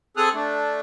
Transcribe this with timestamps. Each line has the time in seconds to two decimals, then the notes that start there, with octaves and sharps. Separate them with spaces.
0.17 C4 G#4 A4 D#6 F6 F#6
0.34 A3 D4